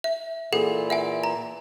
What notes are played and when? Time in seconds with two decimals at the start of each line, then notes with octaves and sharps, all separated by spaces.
0.04 E5
0.53 A#2 E3 G#4 A4 F#5
0.90 E5 F#5 G#5
1.24 A#5